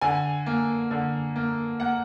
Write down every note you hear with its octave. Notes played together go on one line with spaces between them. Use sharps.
D3 G#5
A#3
D3
A#3
A#3 F#5